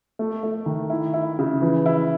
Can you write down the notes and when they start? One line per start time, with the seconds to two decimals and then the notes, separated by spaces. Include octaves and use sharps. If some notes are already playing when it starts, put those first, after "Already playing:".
0.19 A3
0.43 A3
0.66 D#3
0.90 E4
1.14 E4
1.39 C#3
1.62 E3
1.86 E4